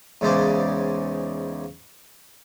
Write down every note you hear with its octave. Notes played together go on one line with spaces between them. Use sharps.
E2 G#2 C#3 C5 D5